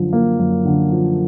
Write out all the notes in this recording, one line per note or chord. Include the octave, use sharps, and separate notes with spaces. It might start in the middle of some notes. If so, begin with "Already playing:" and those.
Already playing: F#2 D3 F3
A#3
F#2
D3
F3